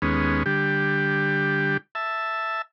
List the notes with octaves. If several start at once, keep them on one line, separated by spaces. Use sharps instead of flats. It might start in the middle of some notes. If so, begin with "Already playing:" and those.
D#2 G#3 B3 C#4
D3 G3 G4
E5 A5